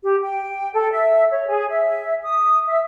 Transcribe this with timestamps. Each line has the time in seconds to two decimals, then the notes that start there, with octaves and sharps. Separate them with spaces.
0.02 G4
0.23 G5
0.74 A4
0.92 E5
1.31 C#5
1.48 G#4
1.69 E5
2.23 D#6
2.66 E5